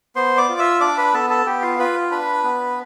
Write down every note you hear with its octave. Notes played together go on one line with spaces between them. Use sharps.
B3 C5 C6
D5 D6
F4
E5 E6
D4 D5 D6
B4 B5
B3 A4 A5
A4 A5
B3 G4 G5
F4 F5
F4 B4 B5
D4 B4 B5
B3